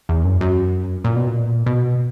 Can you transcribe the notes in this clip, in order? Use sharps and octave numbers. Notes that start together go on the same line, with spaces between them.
E2
F#2
F#2
A#2
B2
A#2
B2